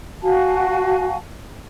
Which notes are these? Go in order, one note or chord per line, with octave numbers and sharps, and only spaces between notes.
F#4 F5 G#5 A5